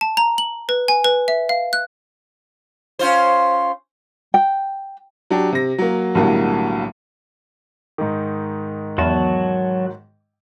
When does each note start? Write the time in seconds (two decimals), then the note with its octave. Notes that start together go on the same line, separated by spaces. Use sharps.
0.01 A5
0.17 A#5
0.38 F#7
0.69 B4
0.88 G#5
1.04 B4
1.28 E5
1.49 F5
1.73 F#6
2.99 C#4 F4 C5
4.34 G5
5.30 F#3 D4 G4
5.52 C3 A#6
5.78 F#3 A#3
6.15 B1 A2 D3 F#3 G3 A#3
7.98 G#2 D#3
8.98 E2 F#3 F#4 A5